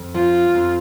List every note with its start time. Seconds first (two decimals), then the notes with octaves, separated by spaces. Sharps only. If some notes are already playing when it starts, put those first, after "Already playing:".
Already playing: F2
0.14 F3 F4
0.55 F2